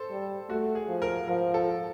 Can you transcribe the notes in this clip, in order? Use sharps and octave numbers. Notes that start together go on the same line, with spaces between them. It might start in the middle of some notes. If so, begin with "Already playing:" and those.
Already playing: A4 C5
G3
A3 F#4
G#4
F3
A#4
F3 A#4
A4